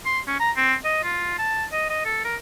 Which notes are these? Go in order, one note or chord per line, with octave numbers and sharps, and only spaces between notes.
C6
C#4
A#5
C4
D#5
F4
A5
D#5
D#5
A4
A#4